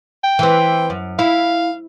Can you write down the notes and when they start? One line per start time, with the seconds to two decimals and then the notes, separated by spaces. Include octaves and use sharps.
0.24 G5
0.39 E3 C4
0.90 F#2
1.19 E4 F5